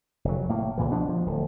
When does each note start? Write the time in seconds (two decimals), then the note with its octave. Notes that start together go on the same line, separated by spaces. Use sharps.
0.25 F1 F#3
0.49 A2 A#3
0.78 C#2 A#2 E3
0.92 B2 F3 D4
1.09 F3
1.26 D1